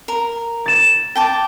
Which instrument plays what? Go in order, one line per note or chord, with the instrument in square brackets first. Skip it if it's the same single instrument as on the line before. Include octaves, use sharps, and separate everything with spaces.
[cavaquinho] A#4
[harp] A6 E7
[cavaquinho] G5 A5 D6